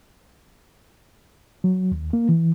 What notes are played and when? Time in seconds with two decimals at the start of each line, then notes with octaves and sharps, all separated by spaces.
1.64 F#3
1.92 D#2
2.13 A#3
2.29 E3